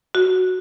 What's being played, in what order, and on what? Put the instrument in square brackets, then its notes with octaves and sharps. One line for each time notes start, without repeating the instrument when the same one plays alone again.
[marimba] F#4